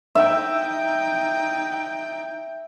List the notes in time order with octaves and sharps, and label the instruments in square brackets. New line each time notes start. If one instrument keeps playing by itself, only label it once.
[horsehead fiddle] D#4 G5 [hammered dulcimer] E5